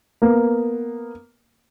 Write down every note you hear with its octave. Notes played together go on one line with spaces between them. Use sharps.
A#3 B3